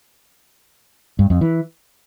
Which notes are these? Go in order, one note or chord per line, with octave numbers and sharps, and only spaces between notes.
G2
F2
E3